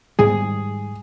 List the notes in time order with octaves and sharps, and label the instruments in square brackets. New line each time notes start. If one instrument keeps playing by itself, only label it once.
[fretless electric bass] G#2 D#3 G3 [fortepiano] G#4